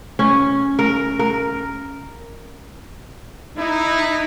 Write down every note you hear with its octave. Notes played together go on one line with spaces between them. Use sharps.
C#4
A#4
A#4
D#4 E4